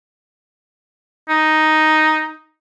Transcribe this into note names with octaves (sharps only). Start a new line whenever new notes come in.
D#4